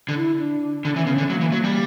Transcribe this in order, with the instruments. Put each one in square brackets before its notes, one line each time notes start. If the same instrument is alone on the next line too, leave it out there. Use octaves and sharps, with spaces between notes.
[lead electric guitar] D3
[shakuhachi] E4
D4
[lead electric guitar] D3 [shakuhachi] D4
[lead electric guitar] E3 [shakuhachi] C#4
[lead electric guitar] C#3 [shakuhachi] B3
[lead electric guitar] D3 [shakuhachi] C#4
[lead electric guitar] F#3 [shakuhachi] A#3
[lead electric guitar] E3
F#3
G3